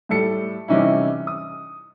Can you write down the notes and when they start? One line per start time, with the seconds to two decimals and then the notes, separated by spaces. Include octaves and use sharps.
0.09 A2 G3 A4 C#7
0.68 C3 E3 G3 C#4 D#4 E4
1.27 D#6